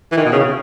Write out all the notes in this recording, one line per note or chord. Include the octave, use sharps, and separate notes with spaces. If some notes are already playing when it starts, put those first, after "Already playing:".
E3
D#3
B2
C#3